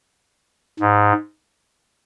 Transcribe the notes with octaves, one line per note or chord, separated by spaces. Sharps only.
G#2